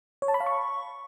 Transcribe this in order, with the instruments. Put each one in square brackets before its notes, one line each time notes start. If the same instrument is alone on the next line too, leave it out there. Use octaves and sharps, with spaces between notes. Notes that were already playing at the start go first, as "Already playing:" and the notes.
[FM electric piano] C#5
A5
B5
F5
C#6